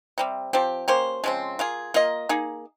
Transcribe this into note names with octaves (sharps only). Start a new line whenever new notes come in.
C3 G3 C4
F3 C4 G4
A#3 C#4 G4 C5
C#3 F3 G#3 C4
A#3 F4 G#4
A#3 F4 A#4 D#5
A#3 D#4 G#4